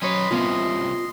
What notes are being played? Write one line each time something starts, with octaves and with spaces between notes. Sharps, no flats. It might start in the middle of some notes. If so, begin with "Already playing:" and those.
F#3 C#4 B4 C#5 D#5 C6
C2 C3 A#3 B3 C#4 F4 F5